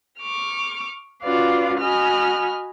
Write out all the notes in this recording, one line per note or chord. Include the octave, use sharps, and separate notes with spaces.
C#6 D6 F6
C#4 F4 F#4 B4 D5 F5
F#4 D#5 G#5 B5 F6